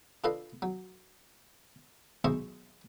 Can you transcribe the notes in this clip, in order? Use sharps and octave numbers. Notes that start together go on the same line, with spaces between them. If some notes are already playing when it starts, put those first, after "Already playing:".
D4 F4 A4 B4 D#5 F5
F#3
B1 G#3 C5 D#5 E5 C#6